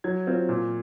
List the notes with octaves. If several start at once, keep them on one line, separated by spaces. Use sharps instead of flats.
F#3 G#6
C4 F4
A#2